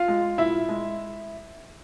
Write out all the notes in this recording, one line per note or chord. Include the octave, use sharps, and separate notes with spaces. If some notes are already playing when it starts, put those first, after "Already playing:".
Already playing: F4 F5
G#3
A#2 E4 E5
G#3